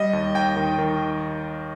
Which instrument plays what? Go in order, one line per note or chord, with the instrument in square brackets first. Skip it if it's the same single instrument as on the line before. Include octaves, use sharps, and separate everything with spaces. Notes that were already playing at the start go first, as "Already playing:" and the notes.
Already playing: [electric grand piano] G3 D#5
D#2
D#2 G5
D#3
D#3